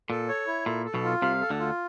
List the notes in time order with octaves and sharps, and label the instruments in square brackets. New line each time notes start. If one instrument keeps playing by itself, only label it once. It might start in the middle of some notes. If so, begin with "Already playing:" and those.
[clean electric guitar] A#2 [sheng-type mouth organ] A4
[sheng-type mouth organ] C#5
E4
[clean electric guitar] A#2 [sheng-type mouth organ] A4
[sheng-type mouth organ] A4
[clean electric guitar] B1 B2
[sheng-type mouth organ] F4
[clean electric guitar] C2 C3 [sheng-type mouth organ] F5
[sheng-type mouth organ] A4
[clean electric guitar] D2 D3
[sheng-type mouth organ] F4